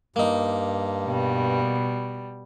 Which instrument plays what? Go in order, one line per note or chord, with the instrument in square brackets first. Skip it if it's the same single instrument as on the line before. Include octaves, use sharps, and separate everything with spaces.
[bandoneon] G2 [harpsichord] A#3 D#4
[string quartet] B2 G3